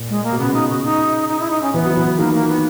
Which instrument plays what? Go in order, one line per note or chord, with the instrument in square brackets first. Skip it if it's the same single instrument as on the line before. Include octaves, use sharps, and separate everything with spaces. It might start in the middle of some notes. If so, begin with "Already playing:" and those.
Already playing: [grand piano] A#2
[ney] G#3
A#3
[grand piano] B2
[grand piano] C#3 [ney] B3
[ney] D#4
F#4
D#4
D#4
E4
D#4
C#4
[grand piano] E3 [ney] B3
[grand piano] F#3
E3
[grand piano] D#3 [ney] A#3
[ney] A#3
B3